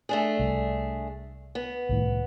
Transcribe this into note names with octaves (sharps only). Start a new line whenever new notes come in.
A3 D4 G#4
C2
B3
C2 A2 D#3